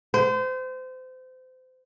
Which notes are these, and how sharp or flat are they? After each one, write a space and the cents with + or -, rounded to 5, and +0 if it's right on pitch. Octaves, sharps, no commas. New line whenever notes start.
C5 -30